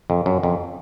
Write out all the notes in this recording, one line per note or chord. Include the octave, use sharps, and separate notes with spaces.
F2
F#2
F2